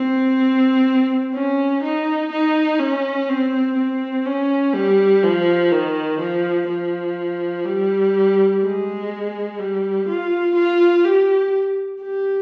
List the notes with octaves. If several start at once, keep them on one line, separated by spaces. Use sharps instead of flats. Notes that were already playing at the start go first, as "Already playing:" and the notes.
Already playing: C4
C#4
D#4
D#4
C#4
C4
C4
C#4
G3
F3
D#3
F3
F3
G3
G#3
G3
F4
F4
G4
G4